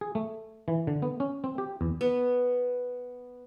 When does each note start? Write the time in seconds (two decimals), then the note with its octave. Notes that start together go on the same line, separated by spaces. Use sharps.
0.01 G#4
0.15 A3
0.68 E3
0.87 D3
1.02 B3
1.20 C#4
1.44 C4
1.58 G4
1.81 E2
2.01 B3